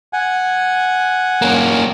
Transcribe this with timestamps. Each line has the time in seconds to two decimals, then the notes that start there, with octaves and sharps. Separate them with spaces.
0.13 F#5 G#5
1.42 A#3 C#4